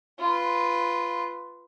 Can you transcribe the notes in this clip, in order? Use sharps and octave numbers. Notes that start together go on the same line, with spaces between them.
F4 B4